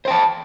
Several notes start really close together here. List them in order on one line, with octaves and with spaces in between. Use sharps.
C5 G5 A5